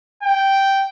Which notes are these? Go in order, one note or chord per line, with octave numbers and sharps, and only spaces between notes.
G5